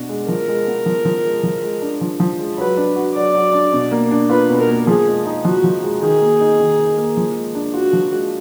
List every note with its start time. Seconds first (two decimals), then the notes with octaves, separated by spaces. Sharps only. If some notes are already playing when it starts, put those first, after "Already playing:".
Already playing: B2 D4 F#4
0.09 G#3
0.28 F3 A#4
0.48 G#3
0.67 B3
0.86 F3
1.05 F3
1.24 G#3
1.43 F3
1.62 G#3
1.82 D4
2.01 F3
2.20 F3
2.39 G#3
2.58 F#3 B4
2.77 D4
2.96 F#4
3.15 F#3 D5
3.34 F#3
3.53 D4
3.73 B2
3.91 A#3
4.11 D4
4.29 F4 B4
4.49 B2
4.59 A#4
4.68 A#3
4.87 F3 G#4
5.07 G#3
5.26 D#4
5.45 F3 F#4
5.64 F3
5.83 G#3
6.02 D#3 G#4
6.21 A#3
6.40 D#4
6.59 D#3
6.79 D#3
6.97 A#3
7.17 F3
7.36 G#3
7.55 D4
7.74 F4 F#4
7.93 F3
8.12 G#3